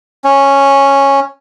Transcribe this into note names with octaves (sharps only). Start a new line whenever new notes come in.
C#4